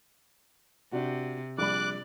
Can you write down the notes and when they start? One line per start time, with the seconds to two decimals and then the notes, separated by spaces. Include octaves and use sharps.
0.92 C3 D4 F#4
1.58 A#1 G3 D5 B5 D6 F#6